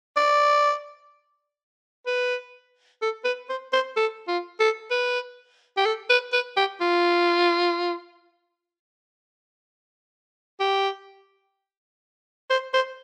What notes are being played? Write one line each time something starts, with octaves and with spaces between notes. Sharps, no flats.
D5
B4
A4
B4
C5
C5
A4
F4
A4
B4
G4
A4
B4
B4
G4
F4
G4
C5
C5